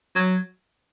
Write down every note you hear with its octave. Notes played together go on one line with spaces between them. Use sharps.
F#3